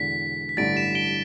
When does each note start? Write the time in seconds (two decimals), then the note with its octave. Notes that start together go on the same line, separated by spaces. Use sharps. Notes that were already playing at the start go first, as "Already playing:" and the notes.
Already playing: E1 E2 D3 B6
0.49 B6
0.57 A1 G2 D3 A6 D7
0.76 B6 E7
0.95 D7 G7